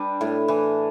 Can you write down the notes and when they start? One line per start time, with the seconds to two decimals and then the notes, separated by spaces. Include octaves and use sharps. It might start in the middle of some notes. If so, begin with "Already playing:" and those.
Already playing: G3 D4 B4
0.21 A2
0.48 E3